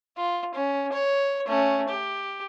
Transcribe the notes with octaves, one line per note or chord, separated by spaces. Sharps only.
F4
C#4
C#5
A3 C#4
G4